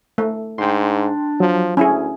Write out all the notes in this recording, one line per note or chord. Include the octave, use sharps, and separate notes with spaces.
A3
G#2 D4 G5 C6
F3 F#3
D2 C#4 E4 G#4